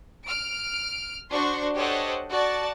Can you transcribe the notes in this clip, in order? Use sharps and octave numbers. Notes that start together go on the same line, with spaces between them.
F6 D7
D4 F#4 C5 C6 C#6
G4 A4 C5 C#5 D#5 F#5
F#4 D5 A5